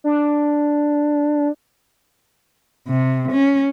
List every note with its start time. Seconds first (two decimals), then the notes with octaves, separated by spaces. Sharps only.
0.04 D4
2.88 C3
3.32 C#4